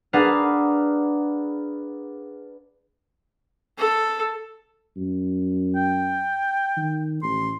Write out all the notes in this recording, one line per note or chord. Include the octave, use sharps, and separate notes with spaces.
D4 G#4 B4 F5 F#5 A#5
A4
F#2
G5
D#3
A1 C6